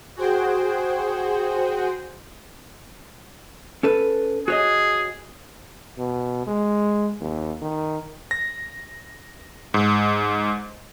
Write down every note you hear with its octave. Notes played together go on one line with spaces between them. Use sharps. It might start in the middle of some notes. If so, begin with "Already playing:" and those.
F#4 G#4 C5 G5
C#4 A4 B4
F#4 G#4 C#5 D#5
B2
G#3
D#2
D#3
A#6
G#2